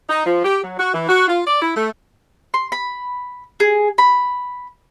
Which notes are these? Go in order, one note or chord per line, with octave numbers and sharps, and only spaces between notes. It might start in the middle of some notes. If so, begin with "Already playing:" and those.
D#4
F3
G4
F#3
F#4
E3
F#4
F4
D5
E4
A3
C6
B5
G#4
B5